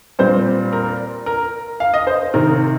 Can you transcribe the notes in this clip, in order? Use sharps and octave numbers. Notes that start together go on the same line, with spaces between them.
A#2 G3 C4 C5
A#4
A#4
F5
D#5
C5
C3 D#3 C4 A#4